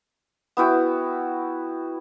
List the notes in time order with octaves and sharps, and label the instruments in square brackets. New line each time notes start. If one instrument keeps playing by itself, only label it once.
[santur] B3 E4 F#4 G5